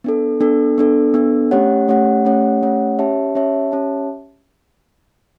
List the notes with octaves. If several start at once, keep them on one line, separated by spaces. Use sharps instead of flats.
B3 D4 A4
B3 D4 A4
B3 D4 A4
B3 D4 A4
A3 C#4 G4 C#5 F#5
A3 C#4 G4 C#5 F#5
A3 C#4 G4 C#5 F#5
A3 C#4 G4 C#5 F#5
C#4 G4 C#5 E5 A5
C#4 G4 C#5 E5 A5
C#4 G4 C#5 E5 A5